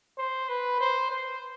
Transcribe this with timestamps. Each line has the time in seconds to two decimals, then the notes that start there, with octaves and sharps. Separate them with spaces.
0.19 C5
0.49 B4
0.81 C5
1.10 C5